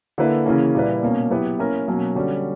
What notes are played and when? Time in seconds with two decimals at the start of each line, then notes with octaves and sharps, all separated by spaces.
0.18 D3 A#3 E4 B4
0.46 C#3 E3 A#3 C#4
0.74 A#2 G3 A#3 E4 B4
1.03 B2 A#3 C#4
1.30 F#3 B3 E4 G4 B4
1.58 A#3 C#4 E4 A#4
1.87 B2 F#3 A#3 C#4
2.15 D3 G3 C#4 F#4